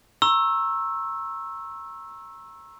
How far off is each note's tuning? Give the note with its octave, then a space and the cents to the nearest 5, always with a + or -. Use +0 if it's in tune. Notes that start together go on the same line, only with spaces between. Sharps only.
A#5 +10 C#6 -35 E6 +0